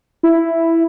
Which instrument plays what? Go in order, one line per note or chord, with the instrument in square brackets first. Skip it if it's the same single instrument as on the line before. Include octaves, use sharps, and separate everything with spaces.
[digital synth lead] E4